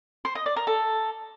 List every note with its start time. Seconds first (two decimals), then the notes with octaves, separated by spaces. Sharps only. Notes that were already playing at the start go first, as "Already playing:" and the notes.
0.25 C5
0.35 D#5
0.46 D5
0.56 A#4
0.67 A4